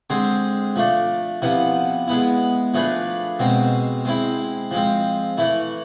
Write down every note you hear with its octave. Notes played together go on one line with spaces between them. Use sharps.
D3 G#3 C4 G#4 C5
F3 A3 D4
C3 F3 B3 E4
G#3 B3 E4
F3 A3 D4 G#4 B4
B2 G#3 C4
G#3 C4 E4
F3 G#3 C4
E3 A3 E4